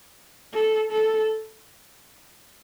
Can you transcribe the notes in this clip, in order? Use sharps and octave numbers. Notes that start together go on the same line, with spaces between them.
A4
A4